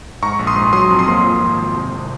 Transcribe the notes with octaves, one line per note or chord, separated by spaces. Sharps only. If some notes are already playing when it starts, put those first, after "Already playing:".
G#2 A#5 C#6
A#1
C6 D#6
G#2
F#3 C6 D#6
F2
C6 D#6
A#3
F3
G#1
G#1
C3
C2